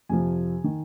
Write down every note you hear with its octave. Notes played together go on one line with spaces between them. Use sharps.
F2 C3 F3 G#5
D#3